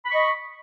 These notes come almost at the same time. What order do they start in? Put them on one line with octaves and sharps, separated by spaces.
B5 C#6 D#5